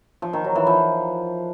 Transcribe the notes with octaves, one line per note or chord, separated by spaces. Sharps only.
F3
D#3
F#3
E3
F3